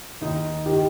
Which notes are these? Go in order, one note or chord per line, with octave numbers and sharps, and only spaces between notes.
D#2 D#4
D#3 G4